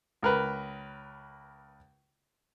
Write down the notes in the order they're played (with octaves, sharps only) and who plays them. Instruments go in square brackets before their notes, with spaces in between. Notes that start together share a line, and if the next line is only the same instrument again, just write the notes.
[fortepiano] C#2 A#4 B4